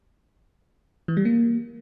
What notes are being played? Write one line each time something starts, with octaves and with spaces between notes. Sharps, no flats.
E3
G3
A#3